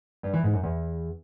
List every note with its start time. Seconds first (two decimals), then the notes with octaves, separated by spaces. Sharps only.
0.23 G2
0.33 E3
0.43 G#2
0.54 F#2
0.64 E2